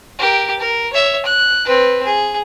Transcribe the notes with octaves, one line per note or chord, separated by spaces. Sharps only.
G4 A#4
A#4
C#5 E5
F#6
C4 B4
G#4